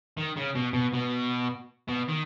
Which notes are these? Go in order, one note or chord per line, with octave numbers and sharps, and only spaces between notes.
D#3
C#3
B2
B2
B2
B2
D#3